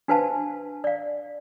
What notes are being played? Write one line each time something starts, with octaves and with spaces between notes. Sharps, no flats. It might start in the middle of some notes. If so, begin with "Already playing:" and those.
D4 F#4 B4 C5 F5 A5
D5 F5